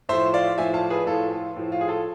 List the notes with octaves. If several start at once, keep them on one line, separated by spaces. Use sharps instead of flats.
A2 F3 C5 E5
D5 F5
A2 F3 E5 G#5
F5 A5
G#4 B4
A2 F3 F4 A4
F4
A2 F3
F4
G#4
F4 A4